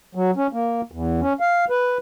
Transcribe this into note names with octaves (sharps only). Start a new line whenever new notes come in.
F#3
C#4
A#3
E2
C#4
F5
B4